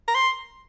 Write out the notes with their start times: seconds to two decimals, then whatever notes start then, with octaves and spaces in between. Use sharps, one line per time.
0.08 A#5
0.15 C6